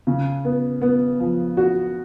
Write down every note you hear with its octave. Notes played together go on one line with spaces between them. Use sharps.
C#3
B3
B3
F3
F#4